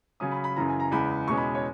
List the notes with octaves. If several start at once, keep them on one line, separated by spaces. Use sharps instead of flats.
C#3 F#3 C#4 D#6
B5
B5
F#2 C#3 E3 A#5
G#5
A#5
E2 C#3 G#3 B5
E2 B2 G#3 C#4 C#6
B5
C#5